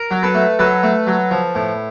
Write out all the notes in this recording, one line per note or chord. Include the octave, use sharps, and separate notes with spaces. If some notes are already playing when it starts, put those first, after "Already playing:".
Already playing: A#4
F#3
A4 B4
A3
F#3 A4 B4
A3
F#3
F3
A2